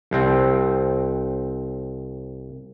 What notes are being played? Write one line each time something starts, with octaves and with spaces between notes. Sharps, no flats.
C2 C4